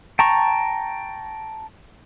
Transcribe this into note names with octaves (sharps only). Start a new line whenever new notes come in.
G5 A5 A#5 C#6